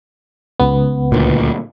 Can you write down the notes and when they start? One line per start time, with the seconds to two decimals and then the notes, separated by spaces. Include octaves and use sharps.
0.60 C#2 B3
1.12 D2 A#2